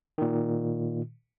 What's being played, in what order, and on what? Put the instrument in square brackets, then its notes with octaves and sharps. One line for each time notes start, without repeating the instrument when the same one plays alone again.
[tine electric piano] A#2 D#3